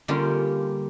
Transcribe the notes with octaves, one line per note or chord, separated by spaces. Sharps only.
D3 G3 A#3 C#4 F4 G4